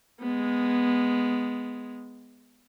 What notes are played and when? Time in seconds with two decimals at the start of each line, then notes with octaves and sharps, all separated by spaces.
0.20 G#3 B3